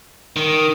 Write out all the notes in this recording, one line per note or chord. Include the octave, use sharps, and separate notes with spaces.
D#3